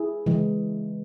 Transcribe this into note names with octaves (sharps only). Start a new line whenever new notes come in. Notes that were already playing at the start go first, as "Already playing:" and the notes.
Already playing: E4 G#4
C#3 E3 G#3